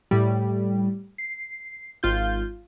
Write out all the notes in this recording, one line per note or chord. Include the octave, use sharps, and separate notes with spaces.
A2 G3
C7
G#1 F4 G6